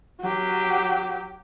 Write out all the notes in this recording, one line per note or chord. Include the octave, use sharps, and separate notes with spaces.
F#3 G4